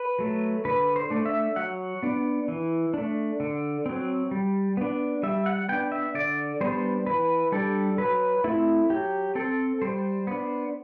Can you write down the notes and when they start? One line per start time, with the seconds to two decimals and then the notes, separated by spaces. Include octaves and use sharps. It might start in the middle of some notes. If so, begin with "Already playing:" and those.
Already playing: B4
0.19 F#3 A3
0.65 D3 B4
0.96 C5
1.10 A3 D4
1.26 E5
1.56 F#3 F#5
2.03 B3 D4
2.48 E3
2.94 A3 D4
3.40 D3
3.86 F#3 C4
4.31 G3
4.77 B3 D4
5.23 G3 E5
5.46 F#5
5.69 B3 D4 G5
5.92 E5
6.15 D3 D5
6.61 G3 B3 D4 C5
7.07 E3 B4
7.52 G3 D4 A4
7.98 F#3 B4
8.44 A3 C4 E4
8.90 F#3 G4
9.35 C4 A4
9.82 G3 C5
10.27 B3 D4